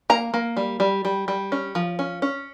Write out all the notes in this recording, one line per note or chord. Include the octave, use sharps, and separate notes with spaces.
A#3 A#5
A#3
G3
G3
G3
G3
C#4
F3
C#4
C#4